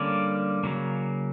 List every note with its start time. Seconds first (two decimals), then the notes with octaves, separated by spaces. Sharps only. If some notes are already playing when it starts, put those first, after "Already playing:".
Already playing: D3 G3 A#3 C#4 D5
0.64 C#3 F#3 A#3